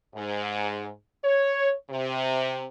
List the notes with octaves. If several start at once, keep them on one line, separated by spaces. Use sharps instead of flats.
G#2
C#5
C3